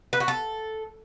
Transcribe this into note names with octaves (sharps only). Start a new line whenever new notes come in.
B4
F#4
A4